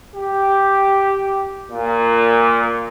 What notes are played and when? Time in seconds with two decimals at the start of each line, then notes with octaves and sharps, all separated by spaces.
0.15 G4
1.69 A#2